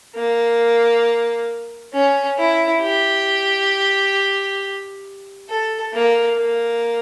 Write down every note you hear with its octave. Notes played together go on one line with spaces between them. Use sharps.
A#3
C#4
E4
G4
A4
A#3
A#3